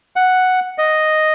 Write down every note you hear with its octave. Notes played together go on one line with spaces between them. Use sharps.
F#5
D#5